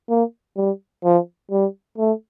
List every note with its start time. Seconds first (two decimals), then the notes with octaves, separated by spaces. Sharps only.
0.09 A#3
0.57 G3
1.04 F3
1.51 G3
1.98 A3